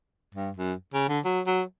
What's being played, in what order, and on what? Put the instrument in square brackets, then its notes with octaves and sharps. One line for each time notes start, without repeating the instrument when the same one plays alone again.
[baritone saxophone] G2
F#2
C#3
D3
F#3
F#3